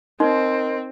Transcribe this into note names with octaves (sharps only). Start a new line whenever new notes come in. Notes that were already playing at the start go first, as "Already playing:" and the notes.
C4 D#4 A#4 D#5 C6